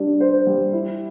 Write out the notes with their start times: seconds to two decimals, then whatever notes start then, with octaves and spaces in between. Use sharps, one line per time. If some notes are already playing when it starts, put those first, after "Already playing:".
Already playing: G3 D4 G4
0.20 C5
0.47 G3
0.73 E4